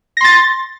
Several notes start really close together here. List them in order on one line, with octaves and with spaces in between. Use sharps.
A#6 C6 A6